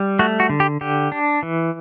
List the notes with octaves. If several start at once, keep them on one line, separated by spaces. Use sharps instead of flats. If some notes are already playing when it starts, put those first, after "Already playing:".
Already playing: G3
A3 F#4
F#4
D3
G4
D3 G4
D4
E3